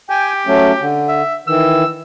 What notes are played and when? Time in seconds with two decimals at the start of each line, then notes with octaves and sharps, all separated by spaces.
0.10 G4 G5 G#5
0.47 F#3 A3 C#4
0.80 D3
1.08 E5
1.47 D#3 E3 E6